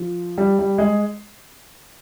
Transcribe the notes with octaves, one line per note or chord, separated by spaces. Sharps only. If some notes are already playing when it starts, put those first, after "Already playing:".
Already playing: F3
G3
G3
G#3